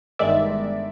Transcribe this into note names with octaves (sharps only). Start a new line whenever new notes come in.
G1 G2 D#3 G#3 D5 E5